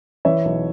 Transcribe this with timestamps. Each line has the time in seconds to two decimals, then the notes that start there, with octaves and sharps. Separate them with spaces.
0.25 E3 C#5 E5
0.45 B1